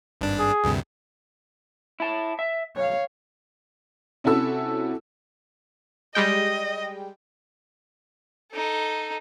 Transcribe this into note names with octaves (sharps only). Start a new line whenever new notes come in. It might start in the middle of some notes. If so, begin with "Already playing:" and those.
G#1 G2 D4
G#4
D2 G2 C3
E4 A5
E5
B1 C#5 F5
C3 C#4 E4 F#4 A4 E6
G3 G#3 D#5 G5
D#4 A4